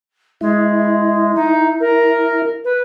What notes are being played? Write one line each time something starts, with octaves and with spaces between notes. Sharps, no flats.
G#3 E4
D#4
A#4
B4